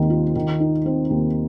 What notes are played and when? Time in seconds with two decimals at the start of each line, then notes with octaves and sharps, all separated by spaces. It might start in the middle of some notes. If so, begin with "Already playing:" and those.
Already playing: D#2 D#3 C4
0.10 F4
0.36 D#3
0.60 D#4
0.86 C4
1.10 D#2